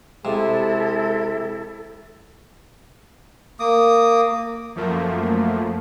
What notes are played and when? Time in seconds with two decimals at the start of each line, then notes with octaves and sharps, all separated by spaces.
0.25 C3 G#3 E4 A4
3.60 A#3 D6 D#6
4.75 F#2 F3 A3 A#3